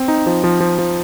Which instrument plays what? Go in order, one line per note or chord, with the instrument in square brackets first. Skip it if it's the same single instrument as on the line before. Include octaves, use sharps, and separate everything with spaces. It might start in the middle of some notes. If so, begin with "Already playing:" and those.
Already playing: [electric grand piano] C4
D#4
F3
F3
F3
F3